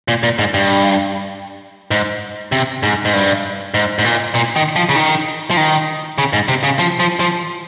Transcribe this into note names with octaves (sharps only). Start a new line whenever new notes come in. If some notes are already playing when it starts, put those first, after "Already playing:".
A#2
A#2
G#2
G2
G#2
C3
G#2
G#2
G2
G#2
G#2
A#2
A#2
D#3
F3
C#3
D#3
F3
D#3
C#3
G#2
C3
C#3
F3
F3
F3